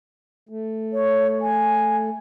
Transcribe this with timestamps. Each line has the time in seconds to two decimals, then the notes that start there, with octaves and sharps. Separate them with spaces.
0.49 A3
0.93 C#5
1.42 G#5